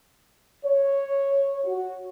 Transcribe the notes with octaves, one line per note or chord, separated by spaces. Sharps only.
C#5
F#4